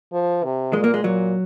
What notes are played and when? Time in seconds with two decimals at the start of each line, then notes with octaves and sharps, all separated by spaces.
0.13 F3
0.44 C3
0.73 A#2 G#3
0.84 A#3
0.94 G#3
1.03 A#2 F#3